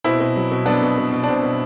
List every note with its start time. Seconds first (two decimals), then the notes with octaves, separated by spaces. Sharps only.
0.04 B2 C4 E4
0.20 B2
0.36 F#3
0.51 B2
0.66 F#3 B3 D4
0.82 B2
0.98 B2
1.12 B2
1.23 D4
1.27 B2 C4
1.43 B2